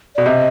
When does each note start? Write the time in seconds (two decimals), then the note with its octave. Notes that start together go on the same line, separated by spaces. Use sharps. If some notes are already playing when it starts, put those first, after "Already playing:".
0.16 B2 D5
0.26 C3 D#5